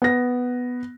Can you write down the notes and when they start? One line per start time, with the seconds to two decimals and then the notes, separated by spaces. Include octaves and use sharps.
0.02 B3 A#6